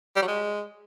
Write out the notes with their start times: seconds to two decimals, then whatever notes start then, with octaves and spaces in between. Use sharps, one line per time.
0.16 G3
0.22 F#3
0.28 G#3